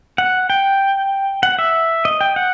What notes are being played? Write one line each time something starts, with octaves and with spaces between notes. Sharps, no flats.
F#5
G5
F#5
E5
D#5
G5
F#5